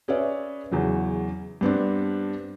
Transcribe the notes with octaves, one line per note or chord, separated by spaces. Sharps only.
C#4 G#4 B4 C#5 D5 E5
E2 C#3 F#3
G2 B3 C4 D4